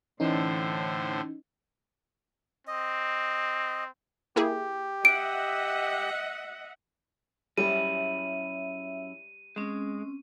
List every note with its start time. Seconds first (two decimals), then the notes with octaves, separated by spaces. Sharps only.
0.20 A2 D3 E3 C#4 D#4 C5
2.67 C4 D#5
4.36 A#3 E4 G4 G#4
5.05 D#5 E5 F#5 D7
7.58 F#2 G3 E4 C#5 E5 D#7
9.56 G#3 C4 C#4